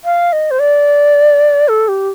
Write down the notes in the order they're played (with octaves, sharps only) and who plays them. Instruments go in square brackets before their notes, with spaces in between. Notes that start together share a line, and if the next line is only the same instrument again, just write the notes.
[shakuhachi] F5
D#5
C5
D5
A4
G4